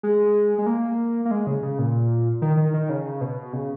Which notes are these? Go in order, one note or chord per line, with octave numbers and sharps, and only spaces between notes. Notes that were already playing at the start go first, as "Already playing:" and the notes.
G#3
G#3
A#3
A#3
G#3
C#3
C#3
A#2
D#3
D#3
D#3
C#3
B2
C#3